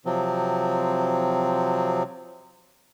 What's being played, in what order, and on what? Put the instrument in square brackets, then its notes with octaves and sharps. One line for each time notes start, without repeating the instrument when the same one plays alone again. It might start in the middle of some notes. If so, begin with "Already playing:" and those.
[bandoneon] C3 F3 F#3 C4